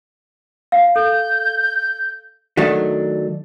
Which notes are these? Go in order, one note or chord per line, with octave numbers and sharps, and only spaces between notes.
F5
A4 G6
D#3 F#3 A3 D4